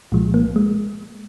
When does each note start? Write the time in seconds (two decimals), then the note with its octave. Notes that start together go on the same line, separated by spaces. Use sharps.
0.12 C2 A#2 F3 G#3
0.34 A#3
0.56 G#3